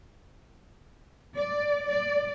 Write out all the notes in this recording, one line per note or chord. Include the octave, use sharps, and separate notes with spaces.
D5
D5